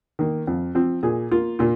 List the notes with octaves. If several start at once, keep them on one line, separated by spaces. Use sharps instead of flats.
D#3 A#3
F2
F3 C4
A#2 G#4
A#3 F4
A#2 F4